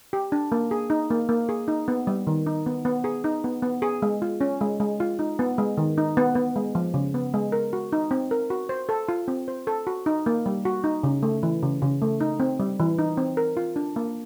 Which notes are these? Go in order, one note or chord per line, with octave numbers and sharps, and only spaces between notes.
G4
D4
A#3
G#4
D#4
A#3
A#3
G#4
D#4
B3
G3
D#3
D#4
B3
B3
G#4
D#4
B3
B3
G#4
G#3
F4
C#4
G#3
G#3
F4
D#4
B3
G#3
D#3
D#4
B3
B3
G#3
F3
C#3
B3
G#3
A#4
F#4
D#4
C4
A#4
F#4
C5
A4
F4
C4
C5
A4
F#4
D#4
A#3
G3
F#4
D#4
C#3
A3
E3
C#3
C#3
A3
D#4
C4
G3
E3
D#4
C4
A#4
F4
D4
A#3